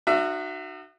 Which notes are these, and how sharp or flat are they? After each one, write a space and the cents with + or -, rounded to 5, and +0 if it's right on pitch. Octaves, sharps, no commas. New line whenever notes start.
D#4 -35 F#4 +0 E5 +30